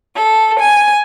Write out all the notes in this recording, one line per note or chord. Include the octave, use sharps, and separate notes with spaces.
A4
G#5